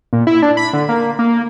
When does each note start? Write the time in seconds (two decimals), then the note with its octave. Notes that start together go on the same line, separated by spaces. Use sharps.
0.13 A#2
0.27 E4
0.42 D4
0.57 B5
0.73 D3
0.89 A#3
1.19 A#3